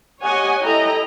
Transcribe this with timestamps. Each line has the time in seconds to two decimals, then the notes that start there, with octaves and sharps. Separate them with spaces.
0.20 G4 C#5 D#5 F#5 G#5
0.63 E4 A4 D#5 G5 A#5